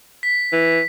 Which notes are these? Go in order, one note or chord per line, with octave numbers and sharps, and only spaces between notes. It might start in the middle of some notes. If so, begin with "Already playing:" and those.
B6
E3